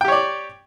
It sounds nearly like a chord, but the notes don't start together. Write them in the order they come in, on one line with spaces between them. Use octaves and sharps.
G5 G4 C#5 D5